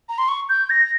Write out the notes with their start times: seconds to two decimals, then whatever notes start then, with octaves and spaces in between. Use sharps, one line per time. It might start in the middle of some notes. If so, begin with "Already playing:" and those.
0.09 A#5
0.18 C6
0.28 C#6
0.49 G6
0.70 A#6